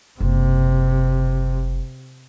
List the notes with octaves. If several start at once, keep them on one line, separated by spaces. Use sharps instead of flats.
F#1 C3